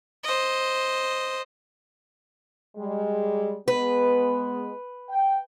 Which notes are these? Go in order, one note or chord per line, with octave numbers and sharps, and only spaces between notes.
C5 D#5
G3 G#3
G#3 B3 B4
G5